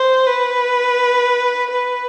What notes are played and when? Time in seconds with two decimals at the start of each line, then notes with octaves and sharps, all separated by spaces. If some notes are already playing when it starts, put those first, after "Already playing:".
Already playing: C5
0.27 B4
1.71 B4